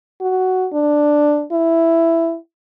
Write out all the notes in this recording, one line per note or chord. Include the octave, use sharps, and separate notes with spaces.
F#4
D4
E4